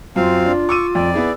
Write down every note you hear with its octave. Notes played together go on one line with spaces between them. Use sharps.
F#2 C4 F4 F5
D4
C#6 D6 E6 D#7
F2 D5
B3 E4 G#4